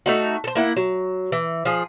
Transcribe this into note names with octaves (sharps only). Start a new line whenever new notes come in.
A3 D#4 F#4
A4 C5
A#3 E4 F#5
F#3
E3
F3 G#4